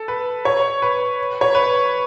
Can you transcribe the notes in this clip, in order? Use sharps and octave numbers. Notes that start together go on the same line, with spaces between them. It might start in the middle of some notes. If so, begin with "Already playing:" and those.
Already playing: A4
B4
C#5
B4
C#5
B4